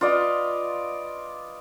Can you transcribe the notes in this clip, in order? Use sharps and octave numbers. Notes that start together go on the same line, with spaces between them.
F4 B4 D5 D#5